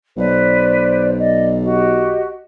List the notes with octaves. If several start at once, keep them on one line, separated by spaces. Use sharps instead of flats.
B1 B4 C5 D5
D5 D#5
F#4 G4 D#5